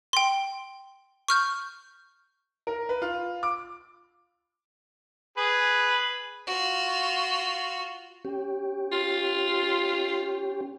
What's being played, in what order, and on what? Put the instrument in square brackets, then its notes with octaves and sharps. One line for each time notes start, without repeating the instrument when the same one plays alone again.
[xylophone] G5 C6
C#6 F6 G6
[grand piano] A#4
B4
F4
D6
[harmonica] G#4 B4
[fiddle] F4 F#4
[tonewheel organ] C#4 G4
[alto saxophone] F4